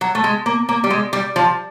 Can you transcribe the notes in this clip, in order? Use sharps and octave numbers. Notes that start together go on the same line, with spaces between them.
F#3
A3
G#3
A#3
A#3
G3
G#3
G3
F3